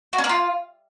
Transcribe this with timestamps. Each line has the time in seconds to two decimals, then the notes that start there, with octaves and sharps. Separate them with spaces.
0.13 F#4
0.18 C#4
0.24 A#3
0.29 F4